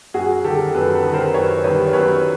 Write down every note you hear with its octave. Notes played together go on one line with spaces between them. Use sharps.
F#2 F#4 G#4
D#3 G3 G4 A4
F#2 A4 B4
A4 B4
D#3 G3
A#4 C5
F#2 B4 C#5
D#3 G3 B4 C#5
F#2 B4 C#5